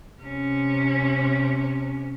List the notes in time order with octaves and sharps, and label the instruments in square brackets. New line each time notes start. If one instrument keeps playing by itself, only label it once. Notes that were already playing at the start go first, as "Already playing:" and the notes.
[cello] C3 C#4